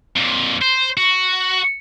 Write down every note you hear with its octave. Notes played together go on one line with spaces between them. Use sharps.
F2 A#2
C5
F#4